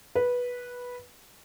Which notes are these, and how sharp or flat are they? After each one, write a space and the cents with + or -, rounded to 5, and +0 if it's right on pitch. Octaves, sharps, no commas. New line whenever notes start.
B4 -10